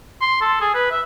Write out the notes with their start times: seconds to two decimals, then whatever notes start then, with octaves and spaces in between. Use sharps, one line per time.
0.21 C6
0.41 A4
0.61 G#4
0.74 B4
0.91 E5